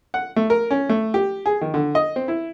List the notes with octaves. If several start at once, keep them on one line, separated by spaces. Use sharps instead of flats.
F#5
A3
A#4
C#4
A3
G4
G#4
D#3
D3
D#5
C4
E4